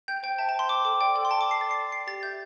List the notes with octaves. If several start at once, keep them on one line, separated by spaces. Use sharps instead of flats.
G5 G6
C5 G5
E5 A5
A5
C5 C6
G5 D6
A4 D6
D5 G5
A4 G5
C6
G5 A5
D6
A4 C7
D5 A6
C7
A4
G5 C7
G4 A6
E5 G6